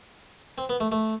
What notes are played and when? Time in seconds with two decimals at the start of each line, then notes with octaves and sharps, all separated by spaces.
0.58 C4
0.69 B3
0.80 A3
0.92 A3